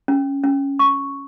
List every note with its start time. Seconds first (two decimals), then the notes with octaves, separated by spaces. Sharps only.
0.08 C#4
0.44 C#4
0.79 C#6